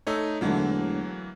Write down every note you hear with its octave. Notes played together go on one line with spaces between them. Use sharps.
A3 D#4 A4 C#5 E6
E1 D3 E3 F#3 A3 A#3